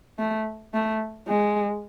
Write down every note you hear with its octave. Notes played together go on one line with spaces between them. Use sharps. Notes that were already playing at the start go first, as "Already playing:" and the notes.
A3
A3
G#3